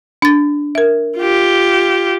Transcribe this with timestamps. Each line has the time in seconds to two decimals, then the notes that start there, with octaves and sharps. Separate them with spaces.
0.22 D4 A6
0.75 A#4 E5
1.18 F4 G4